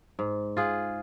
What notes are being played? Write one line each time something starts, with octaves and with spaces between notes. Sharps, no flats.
G#2
F4 G#4 F#5